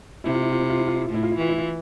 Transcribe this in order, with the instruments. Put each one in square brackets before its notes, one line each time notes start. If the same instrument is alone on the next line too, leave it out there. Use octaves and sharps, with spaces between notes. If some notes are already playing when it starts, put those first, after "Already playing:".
[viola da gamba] C3 [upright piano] E4
[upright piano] F4
E4
F4
E4
F4
E4
F4
E4
F4
[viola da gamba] A2 [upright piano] E4
[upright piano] F4
E4
[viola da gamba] E3 [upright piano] F4
[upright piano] E4
F4